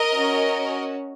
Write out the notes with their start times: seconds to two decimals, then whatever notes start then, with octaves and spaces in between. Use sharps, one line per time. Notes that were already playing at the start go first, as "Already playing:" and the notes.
Already playing: A#4 D#5
0.14 C#4 F#4